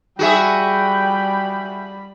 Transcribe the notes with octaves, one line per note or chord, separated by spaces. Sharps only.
G3 F#4 G#4 E5 G5 B5